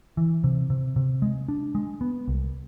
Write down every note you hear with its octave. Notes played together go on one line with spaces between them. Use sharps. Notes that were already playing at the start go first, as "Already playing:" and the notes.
E3
C3
C3
C3
G#3
D4
G#3
B3
C2